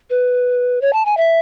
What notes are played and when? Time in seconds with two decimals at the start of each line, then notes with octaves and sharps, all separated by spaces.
0.10 B4
0.81 C#5
0.93 A5
1.05 G#5
1.17 E5